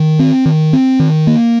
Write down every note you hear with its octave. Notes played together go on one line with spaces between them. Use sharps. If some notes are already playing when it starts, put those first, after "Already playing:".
Already playing: D#3
C4
D#3
C4
D#3
A#3